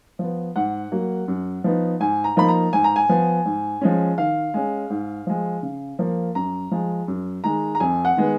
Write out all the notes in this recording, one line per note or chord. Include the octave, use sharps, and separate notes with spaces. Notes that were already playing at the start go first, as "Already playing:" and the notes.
F3 B3
G#2 F#5
F#3 A#3
F#2
F3 B3 D#4
G#2 G#5
A#5
F3 A#3 D#4 B5
A#5
G#2 G#5
A#5
G#5
F3 B3
G#2
F3 G#3 C#4
D#3 F5
G#3 C#4
G#2
F3 G#3
C#3
F3 A#3
F#2 A#5
F3 G#3
F#2
D#3 G#3 A#5
A#5
F2 G#5
F#5
D#3 G#3 B3